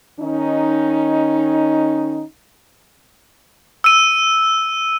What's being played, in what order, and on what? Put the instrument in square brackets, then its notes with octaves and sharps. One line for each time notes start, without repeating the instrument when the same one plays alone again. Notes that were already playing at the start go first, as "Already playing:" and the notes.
[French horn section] D#3 C#4 D#4
[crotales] E6 D#7